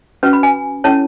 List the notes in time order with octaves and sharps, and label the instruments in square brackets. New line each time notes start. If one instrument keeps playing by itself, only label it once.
[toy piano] C#4 F#4 B4
B5
G#5
C#4 E4 A4 C#5 A5